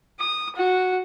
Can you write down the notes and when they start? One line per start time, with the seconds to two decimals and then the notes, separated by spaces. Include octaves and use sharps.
0.20 D#6
0.56 F#4